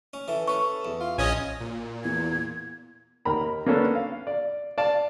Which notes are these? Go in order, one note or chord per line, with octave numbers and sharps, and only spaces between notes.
C#4
E3 A4
C#4 B4 C#6
E2
F4
A#1 C#4 D#5 G#5
A#2
E2 G#6
D#2 A#4 A#5 B5
A#3 B3 C#4 D4 A4
F5
D5
D5 F5 A5